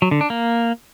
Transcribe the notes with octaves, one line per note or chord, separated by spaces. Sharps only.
F#3
D3
D4
A#3